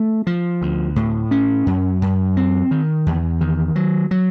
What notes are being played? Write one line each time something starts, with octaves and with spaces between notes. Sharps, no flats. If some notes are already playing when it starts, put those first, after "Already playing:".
Already playing: A3
F3
D2
A2
C#4
F#2
F#2
C4
D#3
E2
D#3
F#3
F#3